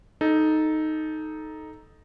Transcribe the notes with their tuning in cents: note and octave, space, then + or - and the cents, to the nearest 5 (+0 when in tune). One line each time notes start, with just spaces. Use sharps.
D#4 +0 A4 -15